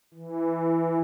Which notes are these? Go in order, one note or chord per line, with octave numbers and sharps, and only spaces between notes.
E3